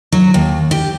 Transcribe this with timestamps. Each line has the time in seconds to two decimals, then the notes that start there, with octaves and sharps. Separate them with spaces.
0.12 F#3
0.34 D#2
0.71 G4